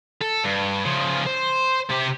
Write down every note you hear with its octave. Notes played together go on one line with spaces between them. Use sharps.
A4
G2
C#3 F3
C5
C3 G4